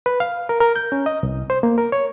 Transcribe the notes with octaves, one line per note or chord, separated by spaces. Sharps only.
B4
F5
A#4
A#4
G6
C#4
D#5
C2
C5
A#3
A#4
C#5